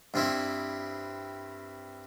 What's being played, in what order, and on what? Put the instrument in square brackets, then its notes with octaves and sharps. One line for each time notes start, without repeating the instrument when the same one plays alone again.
[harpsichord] G2 C4 E4